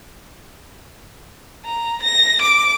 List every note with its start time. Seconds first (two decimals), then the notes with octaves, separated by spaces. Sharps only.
1.65 A#5
2.03 A#6
2.42 D6